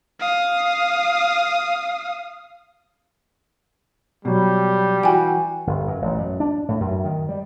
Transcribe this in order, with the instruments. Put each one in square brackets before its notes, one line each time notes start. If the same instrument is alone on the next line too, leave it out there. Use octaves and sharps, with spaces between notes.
[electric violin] F5 D#6
[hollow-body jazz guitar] B2 F#3 [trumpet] G3
[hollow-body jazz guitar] E3 F#4 [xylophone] G5 G#5
[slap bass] G1
F#2
A1
F#2
D4
A2
F#2
D#3
G3